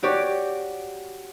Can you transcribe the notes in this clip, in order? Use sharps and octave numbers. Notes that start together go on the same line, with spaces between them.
F#4 G4 C#5 D5